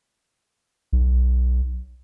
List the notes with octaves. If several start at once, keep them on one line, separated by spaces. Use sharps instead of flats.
B1